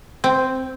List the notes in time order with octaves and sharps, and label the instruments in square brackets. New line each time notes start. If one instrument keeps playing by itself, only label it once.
[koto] C4